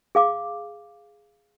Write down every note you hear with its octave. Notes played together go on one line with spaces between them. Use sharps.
G#4 F5 D6